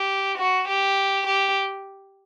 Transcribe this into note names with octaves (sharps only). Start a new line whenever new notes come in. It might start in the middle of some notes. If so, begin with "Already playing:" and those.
Already playing: G4
F#4
G4
G4